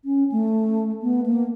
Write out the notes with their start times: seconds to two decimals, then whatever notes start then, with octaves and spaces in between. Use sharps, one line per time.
0.05 C#4
0.32 A3
1.03 B3
1.26 A#3